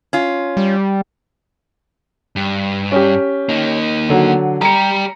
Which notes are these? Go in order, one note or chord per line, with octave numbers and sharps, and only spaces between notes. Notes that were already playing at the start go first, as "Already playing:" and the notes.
C#4 F4
G3
G2
C#4 G4
A#3 D#4
D3 F#3
G3 G4 A#5 C#7